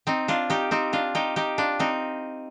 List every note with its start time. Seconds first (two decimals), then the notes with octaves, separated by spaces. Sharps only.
0.07 C4 D#4
0.28 D4 F4
0.50 D#4 G4
0.71 C4 D#4
0.93 D4 F4
1.15 D#4 G4
1.36 D#4 G4
1.58 D4 F4
1.79 C4 D#4